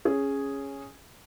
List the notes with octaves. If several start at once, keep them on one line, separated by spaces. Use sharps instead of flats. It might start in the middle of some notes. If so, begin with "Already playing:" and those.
C#4 G#4